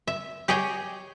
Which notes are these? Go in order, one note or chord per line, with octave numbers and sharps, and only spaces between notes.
E5
G4 G#4 C#5 D#5 G5